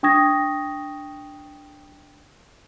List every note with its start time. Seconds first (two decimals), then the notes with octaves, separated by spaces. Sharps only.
0.03 D4 G5 C#6 D#6 G#6 A#6